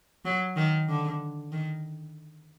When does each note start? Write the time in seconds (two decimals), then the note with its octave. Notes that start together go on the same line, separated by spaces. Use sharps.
0.25 F#3
0.57 D#3
0.89 D3
1.52 D#3